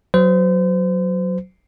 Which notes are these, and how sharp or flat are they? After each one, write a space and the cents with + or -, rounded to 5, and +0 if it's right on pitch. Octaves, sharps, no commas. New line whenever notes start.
F#3 +0 C5 -35